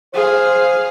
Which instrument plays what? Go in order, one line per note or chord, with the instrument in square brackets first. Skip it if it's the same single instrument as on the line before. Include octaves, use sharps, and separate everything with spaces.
[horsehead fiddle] G#4 F5 [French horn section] C5